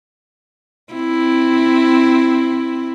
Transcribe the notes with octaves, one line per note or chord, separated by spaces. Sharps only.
C4 E4